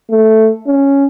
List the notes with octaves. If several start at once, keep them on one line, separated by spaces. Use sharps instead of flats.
A3
C#4